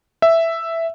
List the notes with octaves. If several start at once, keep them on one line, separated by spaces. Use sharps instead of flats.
E5